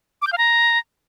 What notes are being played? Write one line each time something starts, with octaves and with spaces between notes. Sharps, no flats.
D6
G6
F5
A#5